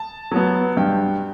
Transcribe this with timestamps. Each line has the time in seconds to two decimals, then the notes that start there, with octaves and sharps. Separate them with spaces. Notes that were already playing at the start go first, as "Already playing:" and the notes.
Already playing: A5
0.31 F#3 B3
0.77 G2 G5